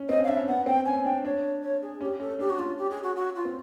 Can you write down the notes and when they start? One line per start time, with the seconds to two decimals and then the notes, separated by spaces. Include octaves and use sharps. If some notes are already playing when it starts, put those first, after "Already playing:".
Already playing: C#4
0.09 C4 D#5
0.18 C#4
0.23 F5
0.28 D4 E5
0.37 C#4
0.48 B3 F#5
0.66 C4 G5
0.85 C#4 G#5
1.05 D4 G5
1.24 D4 C#5
1.63 C#5
1.82 G#4
2.00 C#4 G4
2.20 C#4 A4
2.39 D4 G4
2.50 F#4
2.59 C#4 F4
2.78 G4
2.90 G#4
3.03 F#4
3.16 F#4
3.35 F4
3.45 C4